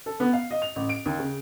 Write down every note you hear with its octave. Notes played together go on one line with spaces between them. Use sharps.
A4
B3
F5
D#5
F7
A1
D7
D#2
C#3